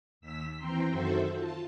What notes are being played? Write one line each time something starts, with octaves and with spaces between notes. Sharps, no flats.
D#2 E6 B6
E3 C4 G5 A#5 C6
F#2 D#3 F#4 A4 C5 E5
F4 A5